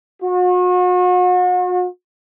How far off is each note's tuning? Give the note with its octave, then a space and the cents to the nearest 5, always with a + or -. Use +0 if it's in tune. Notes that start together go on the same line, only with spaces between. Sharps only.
F#4 -40